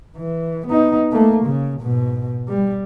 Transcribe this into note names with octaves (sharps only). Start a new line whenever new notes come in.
E3
B3 D#4
A3 A#3
C#3
G#2 B2
G3